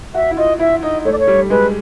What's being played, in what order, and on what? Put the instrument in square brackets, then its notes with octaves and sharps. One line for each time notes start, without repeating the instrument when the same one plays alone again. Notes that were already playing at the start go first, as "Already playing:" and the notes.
[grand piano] F#4 [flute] E5
[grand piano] E4
[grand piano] F4 [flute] D#5
[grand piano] E4 [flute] E5
[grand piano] D#4 [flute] D#5
[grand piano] A3 [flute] C#5
[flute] D5
C#5
[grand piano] G3
[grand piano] G#3 [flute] B4